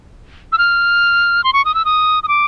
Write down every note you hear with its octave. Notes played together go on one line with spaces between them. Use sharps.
E6
F6
C6
C#6
D#6
E6
D#6
D#6
D6